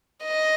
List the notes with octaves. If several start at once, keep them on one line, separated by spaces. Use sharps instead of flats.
D#5